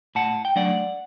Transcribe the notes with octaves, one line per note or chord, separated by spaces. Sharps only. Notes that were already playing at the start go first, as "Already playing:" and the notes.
A2 F#5 A5
G5
F#3 A3 D4 D5 F#5